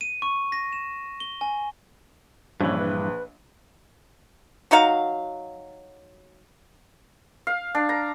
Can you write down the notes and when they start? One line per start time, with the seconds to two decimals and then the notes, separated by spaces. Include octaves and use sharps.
0.01 D#7
0.22 C#6
0.52 A#6
0.73 E7
1.20 G7
1.41 G#5
2.61 A#1 G2 E3 C#4
2.79 B4
4.71 F#3 D#4 F#4 F5
7.47 F5
7.75 D4
7.89 A#5